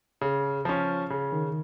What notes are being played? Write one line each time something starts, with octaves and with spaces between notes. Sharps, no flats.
C#3
F3 C#4
C#3
D#3